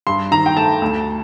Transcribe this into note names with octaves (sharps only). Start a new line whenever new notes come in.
G2 C6
D#3 A#5
G5
A3 A5
D2